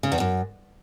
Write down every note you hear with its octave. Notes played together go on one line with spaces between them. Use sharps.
C#3
E2
F#2